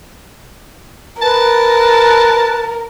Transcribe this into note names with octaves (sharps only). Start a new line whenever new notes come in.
A#4 B4 A5